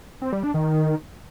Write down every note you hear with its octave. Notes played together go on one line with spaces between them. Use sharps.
C4
G3
D4
D#3